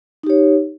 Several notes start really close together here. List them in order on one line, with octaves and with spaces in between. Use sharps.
D#4 G4 C#5